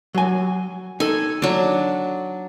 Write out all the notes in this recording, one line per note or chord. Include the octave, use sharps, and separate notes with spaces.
F#3 G#5
D#4 A4 G#5
F#3 D4